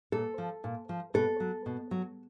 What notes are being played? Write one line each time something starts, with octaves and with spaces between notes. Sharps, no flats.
A#2 A4
F3
A#2
F3
B2 A4
F#3
B2
F#3